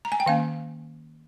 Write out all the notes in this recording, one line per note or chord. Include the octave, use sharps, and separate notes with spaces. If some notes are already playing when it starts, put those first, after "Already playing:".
A#5
G#5
G5
D#3 A#3 C#4 F5